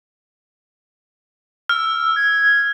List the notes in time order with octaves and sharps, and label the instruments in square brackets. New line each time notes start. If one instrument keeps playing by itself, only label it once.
[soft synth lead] E6 [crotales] F6
[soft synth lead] G#6